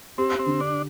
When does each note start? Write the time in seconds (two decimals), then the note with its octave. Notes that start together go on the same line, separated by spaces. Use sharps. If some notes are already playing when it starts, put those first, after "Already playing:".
0.18 C4 G4
0.39 C4
0.46 D3
0.60 D4